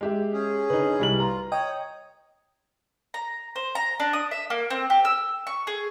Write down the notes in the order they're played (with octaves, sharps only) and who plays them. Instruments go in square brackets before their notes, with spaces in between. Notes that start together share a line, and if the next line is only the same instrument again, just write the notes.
[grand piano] G#3 G4 E5
[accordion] C#4 G#4
[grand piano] D3 D#4 [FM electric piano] B4
[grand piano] C2 G3 F#7
[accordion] F4 [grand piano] A#5
[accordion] C#5 [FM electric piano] D#5 G5 D#6
[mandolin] A#5
C5
A#5
D4
D#6
E5
A#3
C4
G4
E6
C#6
G#4